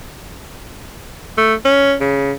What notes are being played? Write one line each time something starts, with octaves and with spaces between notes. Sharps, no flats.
A3
C#4
C#3